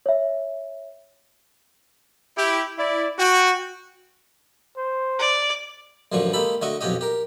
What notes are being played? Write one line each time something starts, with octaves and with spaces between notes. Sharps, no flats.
C#5 E5
E4 G4
E4 D5
F#4 G5
C5
D5
A1 F#2 D3 F3 D4 C#6
G#3 A#3 G4 A4 B5
D3 A3 F#4 D#5 C#6
B1 F2 C#4 F#4 G4 D#5
G4 A#4